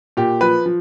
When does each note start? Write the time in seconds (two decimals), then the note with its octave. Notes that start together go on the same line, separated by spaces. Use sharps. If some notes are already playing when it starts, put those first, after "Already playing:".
0.17 A#2 G4
0.41 F3 B4
0.66 F3